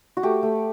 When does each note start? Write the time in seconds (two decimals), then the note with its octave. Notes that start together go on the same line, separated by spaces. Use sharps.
0.17 F#4
0.23 A3 G4
0.43 A3